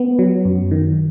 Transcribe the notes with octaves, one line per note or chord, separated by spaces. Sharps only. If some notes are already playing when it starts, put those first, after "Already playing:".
Already playing: B3
F#3
F#2
D#3